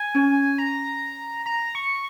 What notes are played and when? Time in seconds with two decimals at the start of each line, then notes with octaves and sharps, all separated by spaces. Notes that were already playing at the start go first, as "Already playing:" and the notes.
Already playing: G#5
0.15 C#4
0.58 A#5
1.46 A#5
1.75 C#6